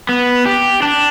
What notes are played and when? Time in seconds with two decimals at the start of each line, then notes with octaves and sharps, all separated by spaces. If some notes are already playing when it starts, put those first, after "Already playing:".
0.09 B3
0.46 G4
0.82 D4